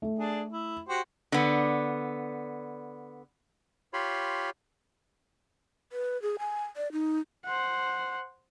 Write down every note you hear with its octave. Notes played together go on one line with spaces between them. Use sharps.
A3
D4 G#4 D5
E4
F#4 G4 C5
D3 B3
F4 G4 C#5 B5 C6
B4
G#4
G#5
D5
D#4
C5 F#5